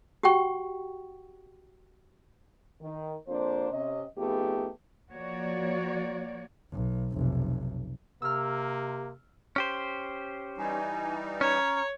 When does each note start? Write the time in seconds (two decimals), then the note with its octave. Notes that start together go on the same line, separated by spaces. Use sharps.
0.23 F#4 G4 F#5 G5 C#6
2.82 D#3
3.28 F2 A#3 D4 C5
3.71 C3 C#4 D#5
4.17 F2 A3 B3 D#4 G4 G#4
5.11 F3 A#3 F#4 C#5 D5
6.71 B1
7.13 F1 B1
8.22 C3 A#3 E6 F6
9.56 C#4 G4 C5
10.58 E3 G3 D#4 G#5
11.41 C#4 C#5 A#5 C#6